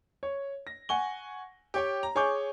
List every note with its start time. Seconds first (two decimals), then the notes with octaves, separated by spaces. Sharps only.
0.23 C#5
0.67 A#6
0.89 F#5 G#5 C#6 G7
1.74 G4 C#5 G5
2.03 A#5
2.15 G#4 C#5 G#5 C#6 D6 G6